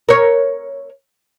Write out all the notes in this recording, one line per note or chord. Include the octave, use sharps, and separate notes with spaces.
A#4 C#5